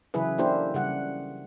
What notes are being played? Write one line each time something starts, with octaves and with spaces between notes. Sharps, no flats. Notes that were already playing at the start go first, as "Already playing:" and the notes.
C#3 E3 F#3 E4 G#4 B4
A#3 D4 E4 G4 A4 C5
C#3 G3 F#5